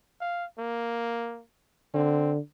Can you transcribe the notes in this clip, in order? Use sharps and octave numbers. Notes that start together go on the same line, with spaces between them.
F5
A#3
D3 C4